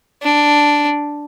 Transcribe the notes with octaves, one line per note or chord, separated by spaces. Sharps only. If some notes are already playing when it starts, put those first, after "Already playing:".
D4